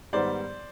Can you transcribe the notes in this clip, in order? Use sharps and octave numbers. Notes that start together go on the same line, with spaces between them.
G#2 D#3 G3 B3 C5 D5